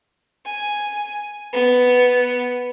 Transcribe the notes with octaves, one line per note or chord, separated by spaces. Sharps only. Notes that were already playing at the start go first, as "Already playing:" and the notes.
G#5
B3